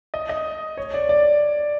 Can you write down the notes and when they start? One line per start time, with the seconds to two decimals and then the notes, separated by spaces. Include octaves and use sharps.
0.14 D#5
0.29 D#5
0.77 C#5
0.94 D5
1.09 D5